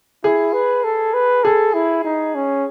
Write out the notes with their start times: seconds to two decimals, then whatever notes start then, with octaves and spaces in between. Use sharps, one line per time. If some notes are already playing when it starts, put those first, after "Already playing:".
0.24 E4 G#4
0.54 B4
0.84 A4
1.14 B4
1.44 G#4 A4
1.74 E4
2.05 D#4
2.35 C#4